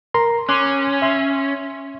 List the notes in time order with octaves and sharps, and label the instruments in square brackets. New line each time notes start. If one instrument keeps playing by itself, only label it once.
[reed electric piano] A#4 A#5 C6
[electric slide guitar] C#4 [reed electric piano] C6 D6 F#6
[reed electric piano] E5 C6